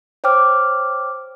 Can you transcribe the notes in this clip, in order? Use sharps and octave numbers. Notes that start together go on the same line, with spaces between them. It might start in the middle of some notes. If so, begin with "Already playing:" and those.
C5 C#5 G5 D6 F6